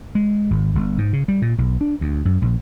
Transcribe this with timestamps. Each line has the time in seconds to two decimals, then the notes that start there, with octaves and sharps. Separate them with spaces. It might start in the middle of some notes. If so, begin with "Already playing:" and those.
0.15 G#3
0.51 G#1
0.75 G1
0.98 G#2
1.13 C#3
1.28 G3
1.42 A#2
1.58 B1
1.81 D4
2.01 D2
2.25 F#2
2.42 A#1